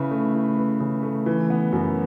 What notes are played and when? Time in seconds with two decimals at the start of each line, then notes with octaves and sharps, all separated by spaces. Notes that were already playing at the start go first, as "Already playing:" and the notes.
Already playing: C#3 E4 B4
0.11 A3
0.34 E4
0.58 B4
0.80 C#3
1.03 A3
1.26 E3
1.50 B3
1.72 F#2